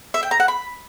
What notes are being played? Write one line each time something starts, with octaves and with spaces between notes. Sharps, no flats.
E5
G5
A#5
F#5
B5